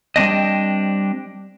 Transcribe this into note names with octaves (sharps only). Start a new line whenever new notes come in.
G3 C4 D4 D#5